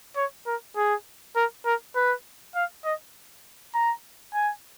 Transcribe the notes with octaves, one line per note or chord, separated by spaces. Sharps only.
C#5
A#4
G#4
A#4
A#4
B4
F5
D#5
A#5
G#5